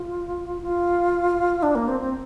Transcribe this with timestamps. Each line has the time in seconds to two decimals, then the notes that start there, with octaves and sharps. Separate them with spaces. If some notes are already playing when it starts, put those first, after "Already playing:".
Already playing: F4
0.62 F4
1.63 D4
1.75 A#3
1.88 C4
2.00 C4